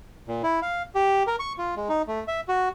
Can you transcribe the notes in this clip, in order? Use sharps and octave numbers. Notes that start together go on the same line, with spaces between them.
A#2
E4
F5
G4
A#4
C#6
F4
G#3
D#4
A3
E5
F#4